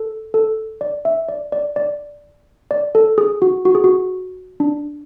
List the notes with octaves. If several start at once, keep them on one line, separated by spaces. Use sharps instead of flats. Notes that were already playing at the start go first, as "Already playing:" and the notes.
Already playing: A4
A4
D5
E5
D5
D5
D5
D5
A4
G#4
F#4
F#4
G#4
F#4
D4